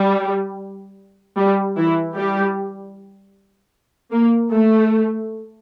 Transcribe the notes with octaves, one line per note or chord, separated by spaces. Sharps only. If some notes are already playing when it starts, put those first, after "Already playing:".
Already playing: G3
G3
E3 E4
G3 G4
A#3
A3